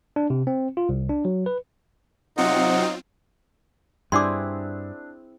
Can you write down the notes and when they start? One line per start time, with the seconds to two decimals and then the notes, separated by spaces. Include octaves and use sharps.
0.16 D4
0.30 C3
0.47 C4
0.77 F4
0.89 C2
1.09 D4
1.25 F#3
1.46 B4
2.38 C3 F#3 C4 D#4 F4 F#5
4.12 G2 C4 D4 E4 G#4 C6 D6